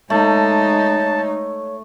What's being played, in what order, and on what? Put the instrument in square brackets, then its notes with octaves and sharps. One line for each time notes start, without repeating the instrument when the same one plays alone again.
[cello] G#3 D#4 [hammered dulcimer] A3 [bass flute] C#5 [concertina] A5